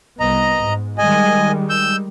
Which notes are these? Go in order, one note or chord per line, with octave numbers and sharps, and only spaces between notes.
C2 B3 D#5 A#5
G#2
D#3 G3 G#3 D#5 G#5
E6 G6